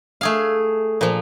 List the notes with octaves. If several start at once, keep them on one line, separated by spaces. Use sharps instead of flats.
A3 G#4 F5
A#2 F3